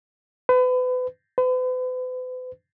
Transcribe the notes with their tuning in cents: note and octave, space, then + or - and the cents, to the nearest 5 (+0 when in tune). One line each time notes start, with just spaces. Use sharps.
B4 +35
B4 +45